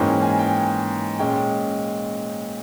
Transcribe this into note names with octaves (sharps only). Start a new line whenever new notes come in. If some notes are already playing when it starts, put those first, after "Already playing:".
Already playing: G#2 E3 A#3 C#4 G5
G#5
G5
A#2 G#3 C#4 G5